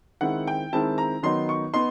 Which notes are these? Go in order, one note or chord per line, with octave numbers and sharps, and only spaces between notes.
D#3 G#3 C4 E4 F#5
G5
D#3 G#3 C4 E4 A5
A#5
D#3 F#3 B3 D#4 C6
C#6
B3 D#4 C6